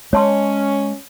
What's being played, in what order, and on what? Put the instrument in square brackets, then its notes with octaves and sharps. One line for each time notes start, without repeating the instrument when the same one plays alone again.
[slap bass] G#3 [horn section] C#4 [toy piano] C#5 A5 C6